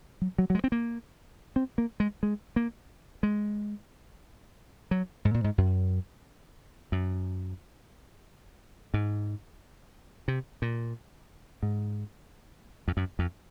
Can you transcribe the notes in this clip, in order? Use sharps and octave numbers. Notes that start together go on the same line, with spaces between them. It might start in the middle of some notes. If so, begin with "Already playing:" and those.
F#3
F#3
F#3
G#3
C4
A#3
C4
A#3
G#3
G#3
A#3
G#3
F#3
G#2
A#2
G#2
F#2
F#2
G#2
C3
A#2
G#2
F2
F#2
F2